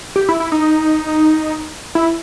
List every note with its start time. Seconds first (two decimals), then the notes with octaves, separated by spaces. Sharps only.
0.16 G4
0.29 E4
0.40 E4
0.52 D#4
1.95 E4